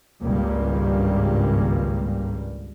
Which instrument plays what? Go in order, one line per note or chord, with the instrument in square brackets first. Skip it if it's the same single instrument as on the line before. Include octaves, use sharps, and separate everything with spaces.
[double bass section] G#1 C#2 G2 G3 A#3